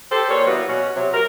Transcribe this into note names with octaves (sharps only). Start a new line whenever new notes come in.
G4 A4 C5
A#2 C#5
E3 F#3 G3 A#3 B3 F#4
B2 C#4 F#4
C3 F#3
A#4